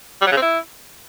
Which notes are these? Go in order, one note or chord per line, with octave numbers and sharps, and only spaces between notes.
G3
F#3
C#3
C4
E4